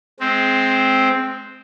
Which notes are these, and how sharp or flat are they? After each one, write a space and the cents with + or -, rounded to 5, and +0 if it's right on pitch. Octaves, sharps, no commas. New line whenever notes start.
G#3 +25 C4 +0